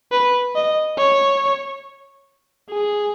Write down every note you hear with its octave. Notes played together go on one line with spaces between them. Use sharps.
B4
D#5
C#5
G#4